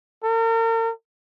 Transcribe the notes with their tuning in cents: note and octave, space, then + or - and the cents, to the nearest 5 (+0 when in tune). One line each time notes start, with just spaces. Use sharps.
A#4 -40